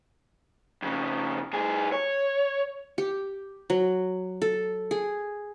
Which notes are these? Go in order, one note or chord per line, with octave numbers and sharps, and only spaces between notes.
F2 C#3
G2 G#4
C#5
G4
F#3
A4
G#4